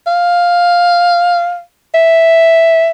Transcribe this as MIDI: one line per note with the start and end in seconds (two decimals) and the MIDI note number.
0.07 1.60 77
1.94 2.91 76